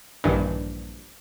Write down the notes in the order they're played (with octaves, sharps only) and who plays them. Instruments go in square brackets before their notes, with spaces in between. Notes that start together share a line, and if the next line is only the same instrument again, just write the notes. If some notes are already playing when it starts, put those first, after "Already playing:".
[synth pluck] A#1 G2 D#3 E3